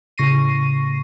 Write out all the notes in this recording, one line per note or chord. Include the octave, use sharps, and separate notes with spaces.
A2 C#3 C#6 A#6 C7 D#7